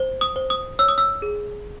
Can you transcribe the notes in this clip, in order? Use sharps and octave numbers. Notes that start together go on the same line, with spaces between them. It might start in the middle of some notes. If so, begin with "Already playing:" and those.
Already playing: C5
D#6
C5
D#6
C#5 E6
D#6
E6
G#4